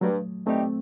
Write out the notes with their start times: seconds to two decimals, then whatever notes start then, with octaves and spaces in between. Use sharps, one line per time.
0.01 G2 F#3 A3
0.47 E3 G3 A3 C4 D#4 G4